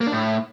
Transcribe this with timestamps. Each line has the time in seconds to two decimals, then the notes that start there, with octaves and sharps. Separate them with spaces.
0.01 A#3
0.07 D4
0.12 A2